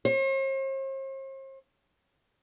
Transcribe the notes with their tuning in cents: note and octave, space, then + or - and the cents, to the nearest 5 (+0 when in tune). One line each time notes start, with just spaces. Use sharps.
C5 +45